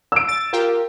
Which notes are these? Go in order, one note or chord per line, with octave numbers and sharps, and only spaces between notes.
E6 D7
A6
F4 G4 A#4